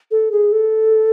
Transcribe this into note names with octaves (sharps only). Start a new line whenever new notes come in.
A4
G#4
A4